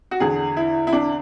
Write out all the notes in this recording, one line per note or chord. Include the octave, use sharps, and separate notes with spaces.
F#4
E2 D3 G#4
E4
E4
D4